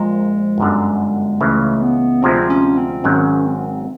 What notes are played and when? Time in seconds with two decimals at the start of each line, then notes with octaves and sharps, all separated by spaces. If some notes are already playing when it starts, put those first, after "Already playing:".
Already playing: A#1 A#2 F3 G#3
0.58 G1 F#2 D3
1.40 C#2 C#3 E3 A3
1.81 B3
2.22 D2 C3 F3 G#3 C4
2.50 C#4
2.77 C4
3.04 G#1 G#2 D#3 F#3 C#4
3.46 C4